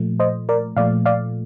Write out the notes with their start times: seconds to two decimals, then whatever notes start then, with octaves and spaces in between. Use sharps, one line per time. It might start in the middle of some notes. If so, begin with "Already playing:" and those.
Already playing: A#2 F3 A3
0.20 C5 D#5
0.49 A#4 D5
0.77 A#2 F3 A3 D5 F5
1.06 D5 F5